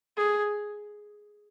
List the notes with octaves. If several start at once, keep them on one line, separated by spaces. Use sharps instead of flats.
G#4